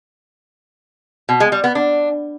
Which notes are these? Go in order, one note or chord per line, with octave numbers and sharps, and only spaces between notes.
B2
G#3
G3
B3
D4